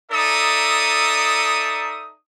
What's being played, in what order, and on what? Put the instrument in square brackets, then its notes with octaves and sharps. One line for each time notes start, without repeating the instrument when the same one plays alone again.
[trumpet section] D#4 A4 D5 E5 A#5 D#6